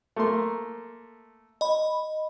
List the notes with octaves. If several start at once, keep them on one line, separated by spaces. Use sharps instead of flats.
A3 A#3 C6
D#5 B5